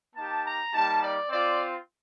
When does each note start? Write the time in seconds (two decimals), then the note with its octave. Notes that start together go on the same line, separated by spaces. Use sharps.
0.14 A#3 D#4 G4 A5
0.43 A#5
0.72 G3 A#3 D#4 G4 A5
1.00 D5
1.29 C4 F4 D5